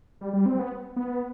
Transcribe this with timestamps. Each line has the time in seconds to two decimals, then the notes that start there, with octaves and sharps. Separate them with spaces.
0.21 G3
0.33 G3
0.46 C4
0.59 B3
0.96 B3